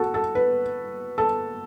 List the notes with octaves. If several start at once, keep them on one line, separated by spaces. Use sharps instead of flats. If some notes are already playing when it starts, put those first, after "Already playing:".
Already playing: F#4 A4
A4
B4
A4